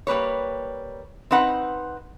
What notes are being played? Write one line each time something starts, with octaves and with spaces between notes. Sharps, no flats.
G3 A#3 B4 C#5
C4 D#4 B4 F#5